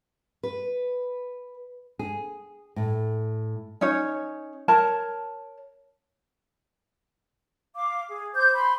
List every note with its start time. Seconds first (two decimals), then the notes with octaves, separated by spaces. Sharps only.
0.43 B4
1.99 G#4
2.76 A2
3.81 C#4 D#4 C#5
4.68 A#4 C#5 A5
7.75 F5 D6
8.08 G#4
8.35 C5 D6 G6
8.54 B5 C6